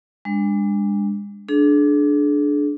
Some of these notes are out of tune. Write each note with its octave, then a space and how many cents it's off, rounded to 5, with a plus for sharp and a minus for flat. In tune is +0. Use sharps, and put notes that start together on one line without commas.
G#3 -35 D4 +0
D4 +0 G#4 +40